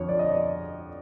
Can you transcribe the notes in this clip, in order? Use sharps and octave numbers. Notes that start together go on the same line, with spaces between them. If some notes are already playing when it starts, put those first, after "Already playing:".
Already playing: F2 D3 F3 C#5
D5
D#5
D5